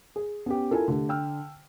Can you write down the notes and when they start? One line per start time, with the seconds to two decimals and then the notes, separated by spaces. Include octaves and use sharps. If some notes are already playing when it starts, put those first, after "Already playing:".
0.16 G#4
0.46 B3 C#4 G4
0.71 E4 F4 A4 A#4 G#5
0.88 D3 A3 G4
1.09 G5 E6 F6